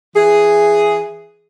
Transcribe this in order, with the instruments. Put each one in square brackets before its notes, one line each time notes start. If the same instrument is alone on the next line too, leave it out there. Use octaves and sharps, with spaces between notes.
[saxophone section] E3 G#4